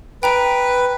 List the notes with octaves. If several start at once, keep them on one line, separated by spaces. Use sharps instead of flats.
B4 G5 A#5 D7